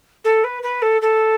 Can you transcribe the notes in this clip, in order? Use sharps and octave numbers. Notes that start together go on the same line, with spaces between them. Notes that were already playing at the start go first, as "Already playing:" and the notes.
A4
B4
B4
A4
A4